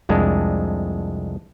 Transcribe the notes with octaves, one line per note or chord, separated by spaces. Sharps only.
C2 F2 G#3 D4